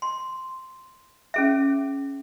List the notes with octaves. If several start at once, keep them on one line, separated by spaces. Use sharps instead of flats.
C6
C#4 G#4 E5